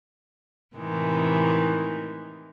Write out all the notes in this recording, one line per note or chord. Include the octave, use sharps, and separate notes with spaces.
A2 C3 D#3 E3 G#3